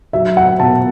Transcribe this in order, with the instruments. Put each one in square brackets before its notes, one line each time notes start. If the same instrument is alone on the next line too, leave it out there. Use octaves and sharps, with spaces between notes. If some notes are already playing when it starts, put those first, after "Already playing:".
[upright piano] F#3 E5
F#5
B2 A5